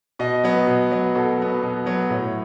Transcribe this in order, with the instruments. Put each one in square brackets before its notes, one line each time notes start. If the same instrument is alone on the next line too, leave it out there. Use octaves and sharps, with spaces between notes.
[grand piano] B2 D#5
F#3 B3
B2
F#3 B3
B2 A4
F#3 B3
B2
F#3 B3
A2